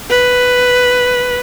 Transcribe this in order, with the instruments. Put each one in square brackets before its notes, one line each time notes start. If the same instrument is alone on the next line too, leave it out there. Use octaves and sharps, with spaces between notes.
[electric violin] B4